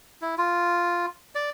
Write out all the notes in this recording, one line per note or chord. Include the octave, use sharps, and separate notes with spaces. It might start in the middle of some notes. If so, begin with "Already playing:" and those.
E4
F4
D5